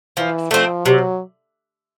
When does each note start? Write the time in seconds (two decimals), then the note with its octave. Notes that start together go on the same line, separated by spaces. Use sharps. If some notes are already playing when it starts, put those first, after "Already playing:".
0.17 E3 F3
0.51 F3 A3 C4
0.85 C3 F#3